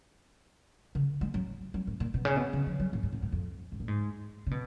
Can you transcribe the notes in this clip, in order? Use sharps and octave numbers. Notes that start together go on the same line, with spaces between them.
C#3
G#3
F#3
F#3
G#2
A#2
B2
C#3
B2
C#3
F3
F#3
A#2
G#2
A#2
G#2
F2
G#2
A#2
G#2
C#3
B2